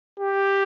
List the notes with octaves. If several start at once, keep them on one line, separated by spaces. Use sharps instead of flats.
G4